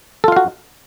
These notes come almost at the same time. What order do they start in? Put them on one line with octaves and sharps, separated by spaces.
A4 F4 F5 F#4